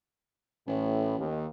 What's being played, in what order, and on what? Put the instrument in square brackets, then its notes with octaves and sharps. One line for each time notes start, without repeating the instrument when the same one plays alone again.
[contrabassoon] A1 [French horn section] A2
[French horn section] D#2